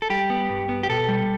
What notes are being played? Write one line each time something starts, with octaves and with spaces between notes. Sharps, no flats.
A4
G3 G4
B3
G2
B3
G4
B2 A4
G3